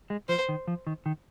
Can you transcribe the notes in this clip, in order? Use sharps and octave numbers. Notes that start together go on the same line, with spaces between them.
G#3
F3 C5
D#3
F3
D#3
D#3